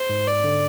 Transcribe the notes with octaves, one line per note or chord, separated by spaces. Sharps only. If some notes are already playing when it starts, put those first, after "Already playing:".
Already playing: C5
G#2
D5
D3